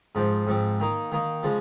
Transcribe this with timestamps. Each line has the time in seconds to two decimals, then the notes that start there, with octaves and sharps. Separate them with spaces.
0.15 G#2 F3 C4
0.47 G#2 F3 C4
0.80 D#3 A#3 D#4
1.12 D#3 A#3 D#4
1.43 C#3 F3 G#3